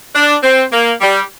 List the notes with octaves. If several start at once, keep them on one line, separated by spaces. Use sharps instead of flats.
D4
C4
A#3
G3